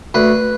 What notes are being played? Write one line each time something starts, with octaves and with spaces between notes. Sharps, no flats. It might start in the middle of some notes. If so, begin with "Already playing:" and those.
D2 B4